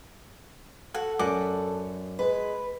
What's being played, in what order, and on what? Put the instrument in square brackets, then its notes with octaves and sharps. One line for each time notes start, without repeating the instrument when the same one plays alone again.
[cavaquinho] F#4 F#5 [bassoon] A4
[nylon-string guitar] F#2 [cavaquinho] D5 F#5 D6
[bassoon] G#3 [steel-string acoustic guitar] B4